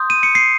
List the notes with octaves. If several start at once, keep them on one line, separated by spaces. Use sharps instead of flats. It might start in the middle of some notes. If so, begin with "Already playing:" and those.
Already playing: C6 D#6 G6
D#7
C#7
C7